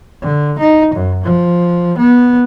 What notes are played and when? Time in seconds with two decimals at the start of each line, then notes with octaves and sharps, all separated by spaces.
0.22 D3
0.58 D#4
0.95 F#2
1.24 F3
1.98 B3